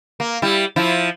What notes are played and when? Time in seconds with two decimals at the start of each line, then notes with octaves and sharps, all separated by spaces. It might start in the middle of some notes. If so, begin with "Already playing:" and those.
0.20 A#3
0.42 G3 E4
0.76 F3 E4